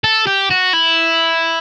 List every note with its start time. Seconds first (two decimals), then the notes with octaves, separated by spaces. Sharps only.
0.04 A4
0.27 G4
0.51 F#4
0.73 E4